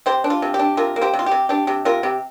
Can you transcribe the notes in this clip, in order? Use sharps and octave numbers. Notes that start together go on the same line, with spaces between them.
C3 G4 C5
D4
F4
C3
G4
D4
C3 F4 A#4
A#3
G4 C5
C3
F4
G4
C3
D4 G4
C3 G4
C3 F4 A#4
C3 G4